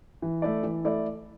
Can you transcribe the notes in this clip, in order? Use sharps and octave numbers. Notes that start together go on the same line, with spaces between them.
E3
A3 E4 A4 D5
E3
A3 E4 A4 D5